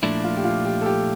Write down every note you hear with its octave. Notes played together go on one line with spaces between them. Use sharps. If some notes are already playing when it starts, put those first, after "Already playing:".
A#2 F3 A3 D4 E4
F4
G4
F4
G4
A4
G4